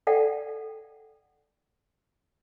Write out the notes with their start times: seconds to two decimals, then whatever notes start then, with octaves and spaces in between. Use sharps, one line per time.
0.07 A4 D5 F#5 G5